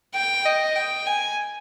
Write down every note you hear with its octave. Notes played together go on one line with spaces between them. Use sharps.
G5
D#5
G5
G#5